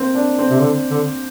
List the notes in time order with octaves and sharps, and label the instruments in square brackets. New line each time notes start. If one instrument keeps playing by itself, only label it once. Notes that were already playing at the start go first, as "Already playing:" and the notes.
Already playing: [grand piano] A#3 C4
D4
C4
[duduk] C3
D3
D3